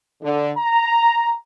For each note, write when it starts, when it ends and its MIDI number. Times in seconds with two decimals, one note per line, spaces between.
0.21 0.50 50
0.57 1.33 82